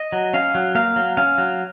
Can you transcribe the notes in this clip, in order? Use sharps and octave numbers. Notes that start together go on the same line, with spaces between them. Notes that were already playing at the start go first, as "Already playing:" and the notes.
Already playing: D#5
F#3
C#4 F5
F#3
A#3 F5
F#3
C#4 F5
F#3